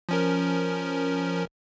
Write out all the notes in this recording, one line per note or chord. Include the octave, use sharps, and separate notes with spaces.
F3 C#4 A#4